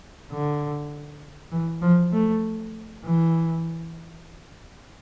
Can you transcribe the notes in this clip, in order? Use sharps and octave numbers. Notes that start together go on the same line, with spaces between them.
D3
E3
F3
A3
E3